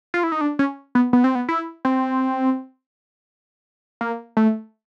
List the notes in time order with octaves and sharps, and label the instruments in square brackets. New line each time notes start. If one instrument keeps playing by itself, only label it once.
[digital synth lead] F4
E4
D#4
D4
C#4
B3
B3
C4
B3
E4
C4
A#3
A3